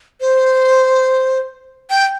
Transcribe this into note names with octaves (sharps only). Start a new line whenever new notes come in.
C5
G5